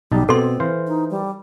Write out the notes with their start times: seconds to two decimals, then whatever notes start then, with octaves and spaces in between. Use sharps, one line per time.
0.12 B1 G3 D#4 A5
0.29 B2 C4 A4 C6
0.60 E3 C5 F5
0.87 D#4
1.10 G3